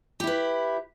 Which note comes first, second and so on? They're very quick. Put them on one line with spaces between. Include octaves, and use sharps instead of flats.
G4 E4 B4